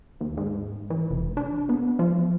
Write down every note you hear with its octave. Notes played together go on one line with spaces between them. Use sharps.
D#2
G#2
E3
F1
D4
B3
F3